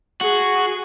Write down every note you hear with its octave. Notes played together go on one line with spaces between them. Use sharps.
F#4 G#4